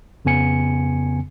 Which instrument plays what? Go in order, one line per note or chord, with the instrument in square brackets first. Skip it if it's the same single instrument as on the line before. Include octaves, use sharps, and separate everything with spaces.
[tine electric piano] F2 C#3 B3 G#5 C#7